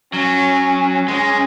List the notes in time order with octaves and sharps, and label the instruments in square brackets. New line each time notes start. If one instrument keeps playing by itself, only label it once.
[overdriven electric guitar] F#3 [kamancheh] C#4
[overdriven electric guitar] G#3 [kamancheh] C#4